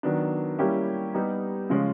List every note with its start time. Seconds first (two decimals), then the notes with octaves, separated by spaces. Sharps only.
0.03 D#3 F#3 B3 D4
0.59 G3 A#3 C#4 E4 G4
1.14 G3 B3 D#4 G4
1.70 C#3 F3 G#3 C#4 F4